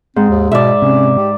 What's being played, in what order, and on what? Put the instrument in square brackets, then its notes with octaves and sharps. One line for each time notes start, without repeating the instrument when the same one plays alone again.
[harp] G#2 [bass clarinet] C4
[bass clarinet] D#2
[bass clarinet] B2 [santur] D5 E5
[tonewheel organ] C3 [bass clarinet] C#4
[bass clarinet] G4